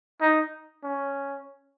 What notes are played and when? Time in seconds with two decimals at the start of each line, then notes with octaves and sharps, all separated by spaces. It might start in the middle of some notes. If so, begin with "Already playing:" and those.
0.21 D#4
0.83 C#4